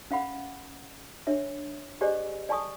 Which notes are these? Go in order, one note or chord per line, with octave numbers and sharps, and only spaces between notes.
C#4 F5 F#5 B5
D4 C#5 E5
G4 G#4 C5 D5 D#5 G#5
D5 G#5 A5 C#6 D#6